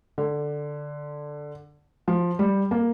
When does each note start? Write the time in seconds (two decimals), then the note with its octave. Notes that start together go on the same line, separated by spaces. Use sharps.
0.18 D3
2.08 F3
2.39 G3
2.71 A#3